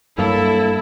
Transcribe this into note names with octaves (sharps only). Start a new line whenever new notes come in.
G2 F#3 A#3 E4 A4